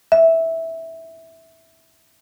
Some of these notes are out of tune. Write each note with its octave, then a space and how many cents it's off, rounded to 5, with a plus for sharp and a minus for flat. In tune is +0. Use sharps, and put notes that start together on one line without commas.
E5 -10